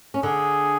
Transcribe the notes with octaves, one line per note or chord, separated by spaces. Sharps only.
C#4
D3 D4 G#4